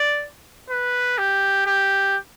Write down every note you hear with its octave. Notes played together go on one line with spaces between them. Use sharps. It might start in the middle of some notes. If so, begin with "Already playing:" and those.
Already playing: D5
B4
G4
G4